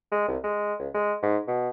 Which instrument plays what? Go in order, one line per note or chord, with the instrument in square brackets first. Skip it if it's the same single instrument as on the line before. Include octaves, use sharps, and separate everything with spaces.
[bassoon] G#3
C2
G#3
C#2
G#3
G#2
B2